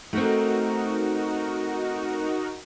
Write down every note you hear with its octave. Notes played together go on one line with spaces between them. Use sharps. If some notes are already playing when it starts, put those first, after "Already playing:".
A3 C4 D#4 F#4 A#4